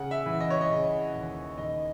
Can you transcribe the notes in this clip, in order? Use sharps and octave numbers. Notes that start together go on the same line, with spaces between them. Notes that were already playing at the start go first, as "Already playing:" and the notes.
Already playing: C#3 F#5
E5
E3
D#5
C#5
D#5
C#3
D#2
D#3 D#5